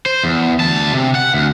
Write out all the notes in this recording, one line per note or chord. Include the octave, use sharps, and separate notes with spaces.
C5
E2
D2 A5
C3
F#5
D2